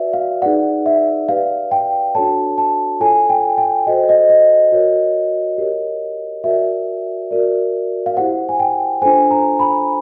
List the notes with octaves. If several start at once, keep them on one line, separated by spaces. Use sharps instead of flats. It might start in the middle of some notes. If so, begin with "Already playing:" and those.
Already playing: F#4 B4 D5 E5
F5
D#4 G#4 B4 D5 F#5
E5
G4 B4 D5 F5
G5
D4 F#4 A4 C#5 A5
A5
F4 A4 C#5 G#5
G5
G5
F#4 A4 C5 D#5
D#5
D#5
F#4 A#4 C#5
G4 A#4 C#5
F#4 A#4 D5 E5
F#4 A#4 D5
F5
E4 G4 C5 F#5
G#5
G5
D4 F4 A4 C5 G#5
A#5
B5